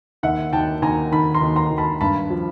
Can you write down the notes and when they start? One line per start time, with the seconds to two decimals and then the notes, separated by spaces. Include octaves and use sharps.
0.23 D#2 E5 F#5
0.53 D#2 G5 A5
0.82 D#2 G#5 A#5
1.12 D#3 A5 B5
1.34 A#5 C6
1.41 D#2
1.56 A#5 C6
1.71 D#2
1.78 A5 B5
2.01 G2 A5 B5
2.30 F3